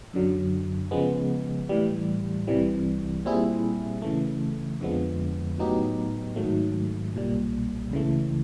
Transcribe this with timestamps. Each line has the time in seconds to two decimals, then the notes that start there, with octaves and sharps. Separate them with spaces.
0.13 F#2 D3 F#3
0.91 C#3 F3 G#3 B3
1.69 A2 E3 G3
2.47 C2 C3 E3 G3
3.25 A#2 G3 C4 E4 G#4
4.02 C#3 E3 A3
4.80 F2 D3 F3 G#3 B3
5.58 A2 F#3 B3 D#4 G4
6.36 G#2 D#3 F#3 A3
7.14 B1 A#2 G3
7.91 C#2 C#3 E3 A3